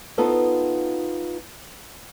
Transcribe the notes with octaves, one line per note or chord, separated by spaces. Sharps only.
B3 D#4 F4 A4 B4 C5